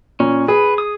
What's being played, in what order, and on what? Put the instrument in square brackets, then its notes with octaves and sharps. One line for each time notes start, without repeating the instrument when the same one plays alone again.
[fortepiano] A#2 [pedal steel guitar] C#4
[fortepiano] G#4 [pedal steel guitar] B4
[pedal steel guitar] D#6